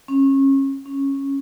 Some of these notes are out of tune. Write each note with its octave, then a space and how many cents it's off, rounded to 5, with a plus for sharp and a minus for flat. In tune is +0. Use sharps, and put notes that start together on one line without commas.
C#4 -25
C#4 -10